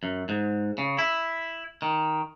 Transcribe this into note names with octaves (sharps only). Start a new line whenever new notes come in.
F#2
G#2
C#3
E4
D#3